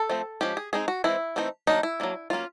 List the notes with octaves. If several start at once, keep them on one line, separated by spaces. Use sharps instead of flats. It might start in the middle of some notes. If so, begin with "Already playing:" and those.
Already playing: A4
F3 A3 C4
F3 G#3 C#4 G4
G#4
G#3 C4 D#4 G#4
F#4
E3 G#3 C4 E4
E3 A3 C4 D#4
D#3 F#3 A#3 D4 D#4
E4
F#3 A#3 D4
F#3 A#3 C#4 F4